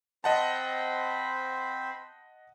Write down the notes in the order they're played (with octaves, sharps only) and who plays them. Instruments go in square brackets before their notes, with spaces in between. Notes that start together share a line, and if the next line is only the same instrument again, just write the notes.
[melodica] C4 C5 B5 [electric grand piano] D#5 F#5 A5